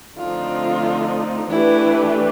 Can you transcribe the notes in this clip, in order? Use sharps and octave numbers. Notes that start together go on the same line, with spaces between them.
D3 F3 A3 C4 D#4 F4
E3 A3 D4 E4 G4 B4